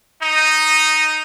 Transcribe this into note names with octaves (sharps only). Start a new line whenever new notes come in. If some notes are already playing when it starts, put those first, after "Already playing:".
D#4